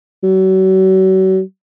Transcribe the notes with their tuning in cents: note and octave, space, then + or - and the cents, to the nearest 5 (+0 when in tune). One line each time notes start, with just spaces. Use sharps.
F#3 +35